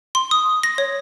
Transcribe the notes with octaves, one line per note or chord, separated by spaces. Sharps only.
C6
D#6
A#6
C#5